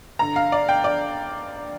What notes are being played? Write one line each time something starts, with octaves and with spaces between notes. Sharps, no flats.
G2 D3 A#5
F5
D5
G5
D5